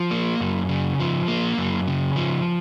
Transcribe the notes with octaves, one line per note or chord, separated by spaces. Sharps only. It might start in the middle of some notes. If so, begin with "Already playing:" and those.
Already playing: F3
A#3
F#2
C#3
F3
A#3
F#2
C#3
F3